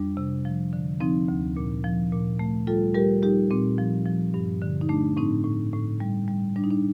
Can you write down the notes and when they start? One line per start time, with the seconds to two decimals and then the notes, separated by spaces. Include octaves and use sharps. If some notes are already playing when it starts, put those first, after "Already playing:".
Already playing: F2 G3 D4
0.17 C3
0.45 F3
0.73 D3
1.00 F3 C4 D#4
1.28 D2
1.57 A#2
1.84 F3
2.12 A#2
2.39 A3
2.67 G3 F4 A4
2.95 G3 G4 A#4
3.23 G3 D#4 G4
3.50 A#2 C4
3.78 F3
4.06 F3
4.34 G2
4.62 D3
4.81 D#4
4.89 A3 D4
5.17 A2 C4 D#4
5.44 A2
5.73 A2
6.00 G3
6.28 G3
6.56 G3 D4
6.64 D#4
6.70 D4